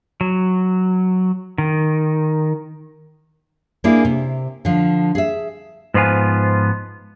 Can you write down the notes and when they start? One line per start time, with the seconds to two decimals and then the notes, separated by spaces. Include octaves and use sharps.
0.21 F#3
1.58 D#3
3.84 A#3 D4 E4 G#4
4.05 C3
4.65 D3 F3
5.15 G#4 E5
5.94 G#2 F3 B3 F4 G#5